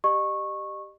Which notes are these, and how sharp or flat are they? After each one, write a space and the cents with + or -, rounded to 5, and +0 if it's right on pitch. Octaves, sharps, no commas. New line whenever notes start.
G4 +0 D#5 -40 C#6 -15